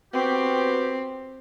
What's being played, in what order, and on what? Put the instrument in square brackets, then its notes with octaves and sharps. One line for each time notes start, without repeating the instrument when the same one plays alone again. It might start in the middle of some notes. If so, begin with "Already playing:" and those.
[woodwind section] B3 F#4 G4 [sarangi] C4